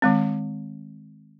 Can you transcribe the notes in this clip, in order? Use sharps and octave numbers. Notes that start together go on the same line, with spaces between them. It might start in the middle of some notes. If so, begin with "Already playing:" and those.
D#3 G#3 C4